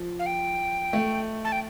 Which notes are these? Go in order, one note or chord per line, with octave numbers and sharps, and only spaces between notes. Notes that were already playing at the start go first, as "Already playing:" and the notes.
Already playing: F3
F5
G5
A3
A5
G5